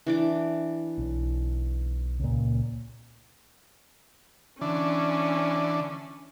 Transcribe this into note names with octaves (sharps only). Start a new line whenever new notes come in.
E3 D4 D6
B1
C#2 A#2
D3 E3 C#4 D4